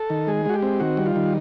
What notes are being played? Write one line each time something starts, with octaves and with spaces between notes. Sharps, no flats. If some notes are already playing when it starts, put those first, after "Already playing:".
Already playing: A4
D#3
G#3 G#4
G#3 F#4
G4
C4
D#3 F#4
G3
F4
D#3